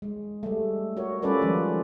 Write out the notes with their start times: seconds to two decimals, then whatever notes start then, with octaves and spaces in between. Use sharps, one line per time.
0.02 G#3
0.43 G3 A3
0.97 F#4 A#4 C#5
1.22 G3 C#4 F4 A4 B4 D5
1.41 D#3 F3 G#3